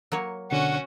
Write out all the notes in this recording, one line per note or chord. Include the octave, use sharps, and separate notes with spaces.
F#3 A#3 C#5
C#2 B2 D3 C#4 F#4 F#5